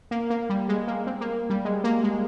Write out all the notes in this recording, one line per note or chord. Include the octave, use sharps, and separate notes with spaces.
A#3
A#3
G3
G#3
A#3
C4
A#3
G3
G#3
A#3
G#3